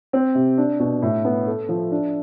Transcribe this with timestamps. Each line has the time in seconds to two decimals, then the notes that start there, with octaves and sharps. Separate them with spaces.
0.13 C4
0.35 C3
0.58 D4
0.80 B2
1.02 A2
1.25 B3
1.46 A4
1.69 F3
1.91 D4